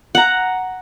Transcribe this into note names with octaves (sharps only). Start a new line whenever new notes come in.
F#5 A#5